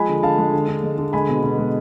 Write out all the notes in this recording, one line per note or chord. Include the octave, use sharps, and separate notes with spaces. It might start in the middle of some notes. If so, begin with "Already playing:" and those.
Already playing: F3 G#3 G#5 B5
D3
D3 F5 A5
G#3
D3
D3
G#3
D3
G#3 G#5 B5
B2
B2
G#3